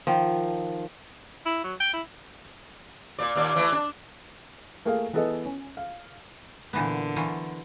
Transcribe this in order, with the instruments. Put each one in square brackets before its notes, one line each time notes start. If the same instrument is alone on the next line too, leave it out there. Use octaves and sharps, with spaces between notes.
[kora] D#3 F3
[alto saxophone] E4
F#3
G5
E4
[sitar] A#2 D5
D#2 A#2 D5
E3 A3
D4
[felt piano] A3 A#3 G#4 A#4 F5
E3 B3 G#4 A4 B4 D#5
C#4
F5
[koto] A#2 E3 B3 [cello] D3
[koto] E3 F#3 F4